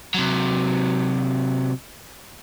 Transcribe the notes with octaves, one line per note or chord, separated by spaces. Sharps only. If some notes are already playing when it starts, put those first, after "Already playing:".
C3 F#3